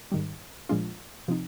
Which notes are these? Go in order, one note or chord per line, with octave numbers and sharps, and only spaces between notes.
G#2 D#3 G3
A#2 F3 G#3 D4 F4
C3 F3 C4 D#4